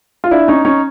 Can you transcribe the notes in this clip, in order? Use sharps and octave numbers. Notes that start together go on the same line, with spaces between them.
F4
D4 E4
C#4 D#4
C#4 D#4